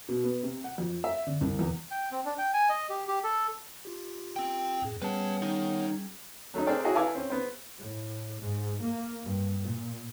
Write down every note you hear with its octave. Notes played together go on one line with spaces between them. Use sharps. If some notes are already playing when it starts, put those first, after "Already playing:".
B2
B3
C3
F#5
F2
E5
D3
C2
E2
G5
C4
D4
G5
G#5
D#5
G4
G4
A4
F4 G4
C4 G5
F2 A2 G#4
G3 B3 C#4 G#4 B4 C#5 F#5 A5
D#3 D#4
F#3 A3 C#4 D#4
A3 C4 D4 G#4 A#4 D5
E4 F#4 G#4 C#5 D#5
E4 A4 B4 F5 G#5 D6
C4 C#4
B3 C5
A2
G#2
A#3
G2
A#2